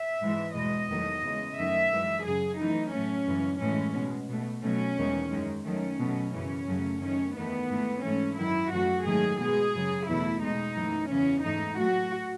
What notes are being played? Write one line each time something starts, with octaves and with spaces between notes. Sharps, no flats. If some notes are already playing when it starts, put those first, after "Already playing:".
Already playing: E5
G#2 E3 G#3
E2 B2 G#3 D#5
E2 D#3 F#3 A3
E2 C#3 G#3
F#2 D#3 A3 E5
F#2 E3 G#3
F#2 C#3 F#3 G#4
F#2 E3 A3 D#4
A2 F#3 A3 C#4
F#2 C#3 E3 G#3
A2 E3 G#3 C#4
B2 G#3
B2 A3
B2 F#3 A3 C#4
E2 D#3 G#3
F#2 D#3 G#3
F#2 D#3 F#3 A3 C#4
B2 F#3 A3
F#2 C#3 E3 C#4
F#2 C#3 F#3 A3
F#2 D#3 A3 C#4
E2 D#3 A3 B3
G#2 E3 A3
G#2 E3 A3 C#4
F#2 D#3 F#3 E4
F#2 E3 A3 F#4
G#2 D#3 F#3 A3 G#4
B2 G#3 G#4
F#2 C#3 F#3
E2 B2 A3 E4
B2 G#3 D#4
F#2 E3 A3
E2 C#3 E3 C#4
G#2 E3 A3 D#4
A2 F#3 A3 F#4